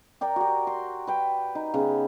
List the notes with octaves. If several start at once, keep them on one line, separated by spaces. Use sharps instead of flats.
A#4 D5 G5
F#4 G4
C6
B4 G5
D#4
C#3 B3